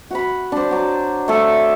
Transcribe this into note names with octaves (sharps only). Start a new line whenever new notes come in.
F#4 F#5 B5
D4 C5
F#3 D6
A3 A4